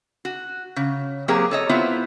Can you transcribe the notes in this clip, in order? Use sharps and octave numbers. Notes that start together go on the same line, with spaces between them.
F#4
C#3
F#3 A#3 C4 G4 G#4 A#4
A4 C#5 D#5
B3 C4 E4 F4